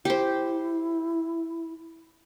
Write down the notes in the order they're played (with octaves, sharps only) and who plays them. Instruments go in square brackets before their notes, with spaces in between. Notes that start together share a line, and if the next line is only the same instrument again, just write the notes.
[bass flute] E4 [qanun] G4 C5